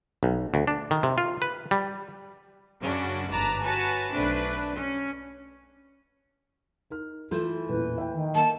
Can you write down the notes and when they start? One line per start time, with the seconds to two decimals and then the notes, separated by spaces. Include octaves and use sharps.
0.23 B1
0.54 D2
0.67 D4
0.91 D#3
1.03 C3
1.18 F4
1.42 B4
1.71 G3
2.81 F#2 C#3 C#4 D4 F#4
3.31 G1 G#2 B4 D5 A5 A#5
3.63 F#4 B4 C#5 G#5 A5
4.13 B1 A3 C4 D4 B4
4.75 C#4
6.90 D#4 A#4 F6
7.31 E3 A3 F4 C6 G6
7.69 A1 E2 A#2 B4
7.98 E5 G5
8.13 D#3
8.35 A#3 A5